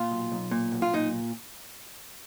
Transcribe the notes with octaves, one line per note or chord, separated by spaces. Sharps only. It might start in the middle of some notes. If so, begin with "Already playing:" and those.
Already playing: A#2 F4
B1
B1
A#2
B1
F4
A#2 D#4